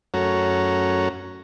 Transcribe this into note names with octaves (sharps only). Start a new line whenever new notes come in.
F#2 A3 C#4 F#4 C#5 A#5